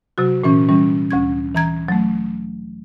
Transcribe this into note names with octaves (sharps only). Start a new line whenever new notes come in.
C3 F#3 F#4
A#2 E3 C#4
E3 G3 C#4
D2 C#4 G#6
E3 A#5 G#6
F#3 A3